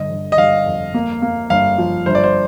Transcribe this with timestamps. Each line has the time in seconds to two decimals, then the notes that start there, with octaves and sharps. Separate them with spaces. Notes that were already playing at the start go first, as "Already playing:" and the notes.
Already playing: G1 D3 D#5
0.11 G1
0.32 D#5
0.38 G1 F5
0.66 F2
0.94 A#3
1.22 A#3
1.50 G1 F5
1.78 F3
2.06 G1 C5
2.15 D5
2.24 C5